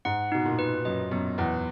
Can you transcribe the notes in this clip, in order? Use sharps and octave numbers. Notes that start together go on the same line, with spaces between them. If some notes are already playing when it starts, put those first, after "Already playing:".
G#2 F#5
B2 D#4
A#2
B4
F#2 D#5
F#2 B3
E2 B4